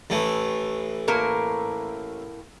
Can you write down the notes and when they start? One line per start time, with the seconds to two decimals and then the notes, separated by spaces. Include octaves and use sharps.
0.10 A1 E3 A3
1.08 A2 A#3 A#4